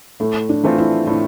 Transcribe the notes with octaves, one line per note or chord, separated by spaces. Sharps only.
A2 A3
D4
E3 A3 C4 F4
E4
A2 D4